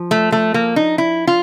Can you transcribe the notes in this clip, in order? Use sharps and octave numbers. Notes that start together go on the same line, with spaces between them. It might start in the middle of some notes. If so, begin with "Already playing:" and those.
Already playing: F3
A3
A3
A#3
D#4
E4
F4